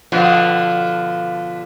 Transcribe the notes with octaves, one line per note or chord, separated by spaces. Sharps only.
B2 D3 F3